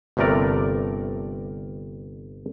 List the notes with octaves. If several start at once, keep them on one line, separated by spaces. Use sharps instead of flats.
G1 G2 C3 A3 A#4 D5